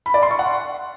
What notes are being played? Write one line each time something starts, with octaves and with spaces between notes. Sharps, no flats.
B5
D5
C6
C#6
F#5